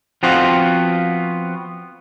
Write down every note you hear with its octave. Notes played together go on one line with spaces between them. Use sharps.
F3 B3 C4 F4 F#4